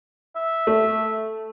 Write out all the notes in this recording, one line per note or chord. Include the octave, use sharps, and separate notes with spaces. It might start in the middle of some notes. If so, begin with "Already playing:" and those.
E5
A3